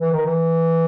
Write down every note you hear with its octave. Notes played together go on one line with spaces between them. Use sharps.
E3
D#3
E3